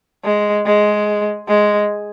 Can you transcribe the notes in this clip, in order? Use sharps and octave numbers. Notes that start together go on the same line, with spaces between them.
G#3
G#3
G#3